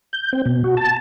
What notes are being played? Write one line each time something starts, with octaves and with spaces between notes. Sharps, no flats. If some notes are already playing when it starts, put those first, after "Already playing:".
G6
C4
B2
F#4
A5